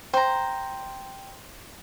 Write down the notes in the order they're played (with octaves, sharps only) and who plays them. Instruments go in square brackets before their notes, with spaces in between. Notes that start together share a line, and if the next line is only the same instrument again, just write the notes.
[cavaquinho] C5 A#5 [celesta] G5